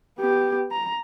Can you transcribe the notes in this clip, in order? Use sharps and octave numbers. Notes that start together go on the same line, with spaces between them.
B3 G4
A#5